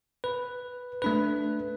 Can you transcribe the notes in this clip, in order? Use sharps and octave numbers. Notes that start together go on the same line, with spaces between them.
B4
A3 D4 B4